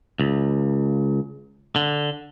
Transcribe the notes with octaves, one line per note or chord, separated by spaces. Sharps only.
C#2
D3